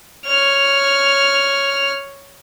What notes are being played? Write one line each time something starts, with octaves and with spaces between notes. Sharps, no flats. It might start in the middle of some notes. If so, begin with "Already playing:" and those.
C#5 F6